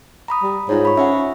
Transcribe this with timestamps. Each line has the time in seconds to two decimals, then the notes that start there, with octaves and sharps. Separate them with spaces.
0.28 A#5 B5 D#6
0.43 G3
0.69 G#2 F4 C#5
0.85 B5 C#6
0.97 C#4 E5 F#5